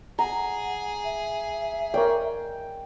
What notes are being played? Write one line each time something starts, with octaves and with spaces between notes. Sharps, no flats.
G#4 F#5 A#5
E5
A#4 C#5 D5 G5